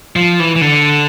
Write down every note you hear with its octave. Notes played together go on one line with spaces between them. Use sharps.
F3
E3
E3
D3